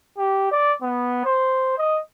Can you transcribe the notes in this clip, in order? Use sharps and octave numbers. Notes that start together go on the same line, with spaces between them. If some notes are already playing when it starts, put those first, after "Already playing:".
G4
D5
B3
C5
D#5